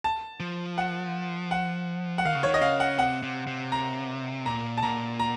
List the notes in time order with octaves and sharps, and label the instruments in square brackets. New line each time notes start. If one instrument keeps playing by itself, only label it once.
[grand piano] A5
[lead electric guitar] F3
[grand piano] F#5
F#5
F#5
[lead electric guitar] D#3 [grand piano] F5
[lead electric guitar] C#3
[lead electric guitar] D#3 [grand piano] C#5
[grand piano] D#5
[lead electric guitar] C#3 [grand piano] F5
[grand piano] F#5
[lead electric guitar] C3 [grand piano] F#5
[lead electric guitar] C3
C3
[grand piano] A#5
[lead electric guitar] A#2 [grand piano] A#5
[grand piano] A5
[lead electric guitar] A#2 [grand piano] A#5
[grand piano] A#5